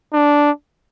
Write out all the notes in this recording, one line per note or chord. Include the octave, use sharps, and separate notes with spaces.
D4